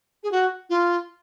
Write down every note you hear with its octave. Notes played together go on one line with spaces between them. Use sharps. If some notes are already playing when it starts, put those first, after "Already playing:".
G#4
F#4
F4